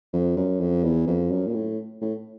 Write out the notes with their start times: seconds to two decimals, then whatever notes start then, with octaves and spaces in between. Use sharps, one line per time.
0.13 F2
0.37 F#2
0.60 F2
0.84 E2
1.07 F2
1.31 F#2
1.47 A#2
1.54 A2
2.01 A2